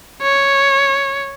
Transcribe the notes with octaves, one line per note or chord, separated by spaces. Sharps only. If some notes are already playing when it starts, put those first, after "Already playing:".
C#5